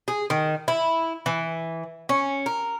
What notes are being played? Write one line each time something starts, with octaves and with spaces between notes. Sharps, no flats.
G#4
D#3
E4
E3
C#4
A#4